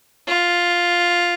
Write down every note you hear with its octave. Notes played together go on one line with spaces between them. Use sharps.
F4